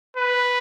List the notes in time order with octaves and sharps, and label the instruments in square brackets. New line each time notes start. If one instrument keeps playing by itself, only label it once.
[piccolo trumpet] B4